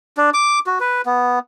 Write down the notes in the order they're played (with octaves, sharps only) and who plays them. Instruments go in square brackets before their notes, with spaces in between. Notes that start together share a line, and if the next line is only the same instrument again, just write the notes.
[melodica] D4
D6
F#4
B4
B3